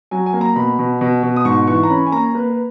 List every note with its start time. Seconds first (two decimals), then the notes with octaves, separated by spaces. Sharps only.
0.11 F#3 G#5
0.26 G#5
0.33 A#3
0.41 A#5
0.56 B2 B5
0.79 B2
1.01 B2
1.23 B2
1.36 D#6
1.45 G#2 C#6
1.68 E3 C#6
1.83 A#5
1.90 C#4 B5
2.06 G#5
2.12 A#3 A#5
2.35 A#3 B4
2.50 B4